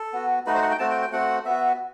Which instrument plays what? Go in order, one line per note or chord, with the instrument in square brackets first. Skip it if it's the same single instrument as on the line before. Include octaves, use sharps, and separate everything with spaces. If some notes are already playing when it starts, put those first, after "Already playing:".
Already playing: [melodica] A4
B3 F#4
A3 D#4 F#4 B4
C5
F#5
G5
A3 C4 F#4 A5
G5
G5
A3 C4 F#4 F#5
B3 F#4 E5